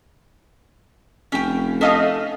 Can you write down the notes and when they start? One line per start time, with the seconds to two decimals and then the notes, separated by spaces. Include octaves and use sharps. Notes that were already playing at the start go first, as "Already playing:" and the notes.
1.32 F1 C#4 G5
1.81 A3 C#4 A4 D#5 F5